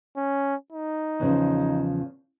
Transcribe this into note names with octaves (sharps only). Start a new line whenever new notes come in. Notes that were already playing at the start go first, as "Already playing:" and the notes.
C#4
D#4
E2 C#3 F3